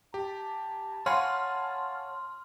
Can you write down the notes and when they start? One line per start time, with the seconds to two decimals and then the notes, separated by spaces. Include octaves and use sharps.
0.14 G4 A5
1.06 C#5 F5 F#5 G#5 B5 C6 F6